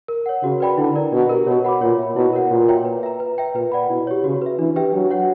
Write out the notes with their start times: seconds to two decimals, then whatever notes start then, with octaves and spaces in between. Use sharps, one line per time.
0.08 A#4
0.26 C#5 F#5
0.43 C#3 F#4
0.60 B4 D5 G5 B5
0.78 D3 E4
0.95 A#4 D5 A#5
1.12 B2 D4
1.29 G4 A#4
1.47 B2 C#5
1.65 F#5 B5 D6
1.81 A#2 C#5
1.99 E5 B5
2.16 B2 E4
2.33 A#4 C#5 F#5
2.51 A#2 F#4
2.68 C#5 E5 G5 A#5
2.85 B4
3.03 E5 A#5
3.20 B4
3.38 E5 G5
3.55 A#2 B4
3.72 D5 F#5 B5
3.89 B2 E4
4.07 G4 C#5
4.24 C#3 F#4
4.42 B4 E5
4.59 E3 D4
4.76 G4 B4 E5 G5
4.93 F#3 D4
5.10 F#4 C#5 F#5